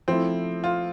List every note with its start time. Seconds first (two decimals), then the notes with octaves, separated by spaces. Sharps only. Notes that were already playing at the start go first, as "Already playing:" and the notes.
0.08 F3 A3 C4 E4
0.64 F4